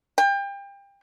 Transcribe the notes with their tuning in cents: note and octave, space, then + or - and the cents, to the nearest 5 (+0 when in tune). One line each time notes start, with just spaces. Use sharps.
G5 +30